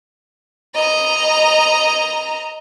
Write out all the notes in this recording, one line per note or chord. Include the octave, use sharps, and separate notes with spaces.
D#5 A#5